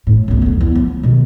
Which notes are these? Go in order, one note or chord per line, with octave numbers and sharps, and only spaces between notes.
A2
G1 C#2
F2 F3
E2
F3
B2 D#3